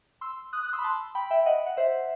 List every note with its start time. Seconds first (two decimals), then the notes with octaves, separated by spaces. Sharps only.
0.21 C6 E6
0.53 D#6 F#6
0.63 D#6 F#6
0.73 C6 E6
0.78 B5
0.83 A5 C6
1.15 G5 B5
1.31 E5 G5
1.46 D#5 F#5
1.66 F#5
1.77 C5 E5